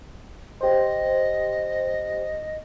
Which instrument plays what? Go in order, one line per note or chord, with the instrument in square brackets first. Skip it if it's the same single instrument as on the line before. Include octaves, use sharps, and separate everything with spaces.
[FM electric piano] G4 C5 [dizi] D#5